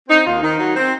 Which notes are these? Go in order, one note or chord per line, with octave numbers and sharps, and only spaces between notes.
C4 D#4
D#2 F4
D#3 D#4
F#3
C4